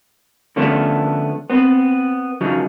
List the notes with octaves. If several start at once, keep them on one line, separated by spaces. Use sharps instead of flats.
D3 F3 A3 B3 C#4 D4
B3 C4
F#2 C#3 F3 F#3 D#4